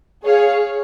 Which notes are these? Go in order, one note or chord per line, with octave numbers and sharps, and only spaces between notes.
G#4 C#5 F5